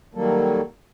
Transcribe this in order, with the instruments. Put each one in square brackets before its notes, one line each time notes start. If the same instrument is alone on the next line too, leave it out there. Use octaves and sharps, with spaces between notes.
[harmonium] D#3 F#3 G3 A#3 A4